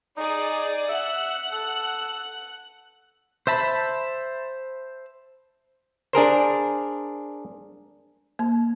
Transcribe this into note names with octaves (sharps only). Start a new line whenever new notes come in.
D#4 G#4 D5
E5 F#5 F#6
A4
C5 E5 A5 B5
D4 G#4 A#4 C5
A#3